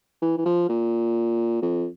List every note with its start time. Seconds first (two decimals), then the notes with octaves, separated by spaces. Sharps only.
0.22 E3
0.38 E3
0.45 F3
0.69 A#2
1.62 F2